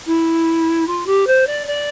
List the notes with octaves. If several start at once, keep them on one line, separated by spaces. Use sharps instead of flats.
E4
F4
G4
C5
D5
D5